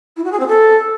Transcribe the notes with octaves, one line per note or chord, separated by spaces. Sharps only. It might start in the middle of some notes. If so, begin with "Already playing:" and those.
E4
F#4
G#4
C4
A4